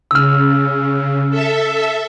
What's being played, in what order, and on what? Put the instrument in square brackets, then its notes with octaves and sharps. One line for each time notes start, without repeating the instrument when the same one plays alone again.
[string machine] C#3 [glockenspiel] E6 F6
[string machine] A4 E5